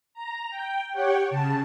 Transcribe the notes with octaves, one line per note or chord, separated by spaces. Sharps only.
A#5
G5
G4 C#5 F#5 G5
C#3 A5